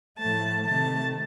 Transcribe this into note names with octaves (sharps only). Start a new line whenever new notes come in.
A2 F3 A3 A5
C3 D#3 A3 A5